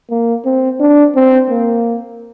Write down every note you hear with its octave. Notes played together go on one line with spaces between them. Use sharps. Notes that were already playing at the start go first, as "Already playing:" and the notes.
A#3
C4
D4
C4
A#3